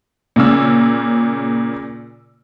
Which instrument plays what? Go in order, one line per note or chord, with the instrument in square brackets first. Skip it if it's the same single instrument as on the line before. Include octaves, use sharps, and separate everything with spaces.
[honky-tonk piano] A#2 C#3 E6